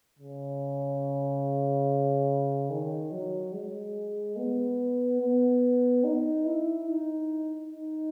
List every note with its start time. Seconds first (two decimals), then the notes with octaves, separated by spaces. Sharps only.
0.19 C#3
2.70 D#3
3.12 F#3
3.53 G#3
4.37 B3
5.21 B3
6.04 D#4
6.46 E4
6.88 D#4
7.71 D#4